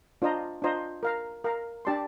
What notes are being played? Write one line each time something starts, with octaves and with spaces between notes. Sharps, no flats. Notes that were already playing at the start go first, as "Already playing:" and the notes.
D4 F4 C5 D#5 A#5
D4 F4 C5 D#5 A#5
A#4 F5 A#5
A#4 F5 A#5
D4 G4 D5 A5 C6